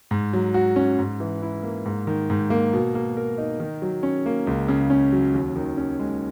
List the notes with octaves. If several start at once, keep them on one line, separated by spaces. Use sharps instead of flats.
G#2
F#3
F#4
C#4
G#2
E3
E4
A#3
G#2
D#3
G#2
A#3
B2
A#3
A#4
D#4
D#3
F#3
C#4
A#3
C#2
C#3
C#4
F#3
D#2
D#3
C#4
G#3